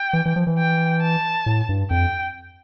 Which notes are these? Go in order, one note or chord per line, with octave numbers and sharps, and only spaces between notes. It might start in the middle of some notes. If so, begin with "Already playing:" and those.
Already playing: G5
E3
E3
F3
E3
G5
A5
A2
G2
F2 G5